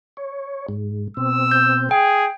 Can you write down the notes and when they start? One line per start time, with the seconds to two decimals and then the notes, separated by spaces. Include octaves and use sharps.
0.17 C#5
0.69 G#2
1.17 B2 C4 E6
1.51 G6
1.91 G#4 G5